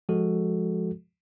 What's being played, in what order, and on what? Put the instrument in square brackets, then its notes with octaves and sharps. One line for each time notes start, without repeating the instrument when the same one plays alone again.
[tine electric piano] F3 G#3 F#4 A4